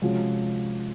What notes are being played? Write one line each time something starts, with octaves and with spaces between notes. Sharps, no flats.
C3 F3 G#3 C#4 F#4